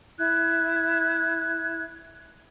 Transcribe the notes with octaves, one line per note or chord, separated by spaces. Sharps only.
E4 F#6 G#6